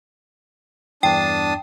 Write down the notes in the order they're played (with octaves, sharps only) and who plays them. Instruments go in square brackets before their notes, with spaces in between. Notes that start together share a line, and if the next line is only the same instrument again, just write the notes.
[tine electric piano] E2 G2 E3 [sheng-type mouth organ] D4 A5 D#6 [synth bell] G5